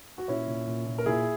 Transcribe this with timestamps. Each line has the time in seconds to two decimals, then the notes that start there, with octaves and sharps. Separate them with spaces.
0.18 F#4
0.28 A#2 C#4 E4
0.47 A#2
0.67 A#2
0.86 A#2
0.98 A#4
1.06 A#2 E4 G#4